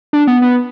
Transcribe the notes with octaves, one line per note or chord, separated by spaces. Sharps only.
D4
B3
B3